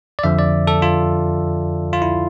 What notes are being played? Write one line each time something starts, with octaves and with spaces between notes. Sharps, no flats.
D5
F2 D3 F3 E5
D5
A4
F4
F4
E4